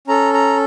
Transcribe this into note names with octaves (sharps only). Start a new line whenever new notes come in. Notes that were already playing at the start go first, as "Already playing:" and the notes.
C#4 A4 A#5
A#5